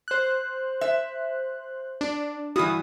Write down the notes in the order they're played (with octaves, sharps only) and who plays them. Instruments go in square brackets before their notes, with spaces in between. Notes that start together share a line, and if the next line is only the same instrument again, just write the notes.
[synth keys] C5 F#6
[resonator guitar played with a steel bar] E5
[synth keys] D4
[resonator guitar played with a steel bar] G2 E3 [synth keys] E4 F#4 D#6